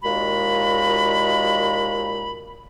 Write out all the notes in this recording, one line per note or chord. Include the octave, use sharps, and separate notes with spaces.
D#2 A#2 G#3 F#4 B5